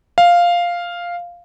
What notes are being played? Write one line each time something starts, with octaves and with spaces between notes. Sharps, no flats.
F5